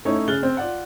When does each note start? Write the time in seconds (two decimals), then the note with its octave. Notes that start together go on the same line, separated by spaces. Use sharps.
0.05 A3 C#4 D#4 E4 C#5
0.28 C#3 G#4 F6 F#6 A6 G7
0.43 C4
0.57 F4 D5 F#5